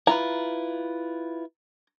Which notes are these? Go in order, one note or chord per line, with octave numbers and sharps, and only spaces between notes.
E4 F4 B4 A#5